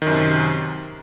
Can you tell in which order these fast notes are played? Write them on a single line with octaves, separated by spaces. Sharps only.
D#3 F#2 C3